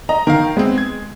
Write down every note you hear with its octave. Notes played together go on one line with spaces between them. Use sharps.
D#5 A#5
D#3 A#4 F5
G#3 B3 C4
G#6